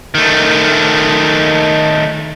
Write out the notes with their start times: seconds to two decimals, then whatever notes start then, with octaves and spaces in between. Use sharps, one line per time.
0.15 D#3 A3